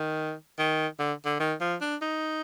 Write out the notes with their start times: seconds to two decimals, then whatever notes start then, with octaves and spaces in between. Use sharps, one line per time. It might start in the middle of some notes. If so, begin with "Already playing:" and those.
Already playing: D#3
0.58 D#3
1.00 D3
1.26 D3
1.40 D#3
1.61 F3
1.81 D4
2.02 D#4